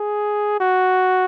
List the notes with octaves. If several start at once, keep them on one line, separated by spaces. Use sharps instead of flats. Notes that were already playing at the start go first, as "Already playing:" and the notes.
Already playing: G#4
F#4